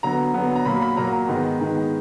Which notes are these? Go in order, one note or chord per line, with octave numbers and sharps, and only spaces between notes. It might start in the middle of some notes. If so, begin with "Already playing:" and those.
D3 F#3 B3 A#5
D3 F#3 B3
A#5
A#2 F#3 A#3 B5
B5
A#2 F#3 A#3 A#5
A#5
G#2 D#3 G#3 B3 A#5
G#2 D#3 G#3 B3